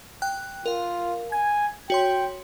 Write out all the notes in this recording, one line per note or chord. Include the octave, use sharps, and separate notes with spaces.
G5 F#6
F4 A#4 F5
G#5 G#6
F#4 C#5 G5 C6